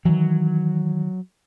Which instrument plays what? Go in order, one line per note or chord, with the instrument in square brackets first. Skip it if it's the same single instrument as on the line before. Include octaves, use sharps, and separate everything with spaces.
[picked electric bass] D#3 E3 [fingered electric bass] F#3